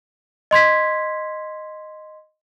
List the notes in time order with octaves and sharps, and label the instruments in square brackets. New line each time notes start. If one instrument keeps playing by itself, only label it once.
[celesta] D#5 C6 G#6 B6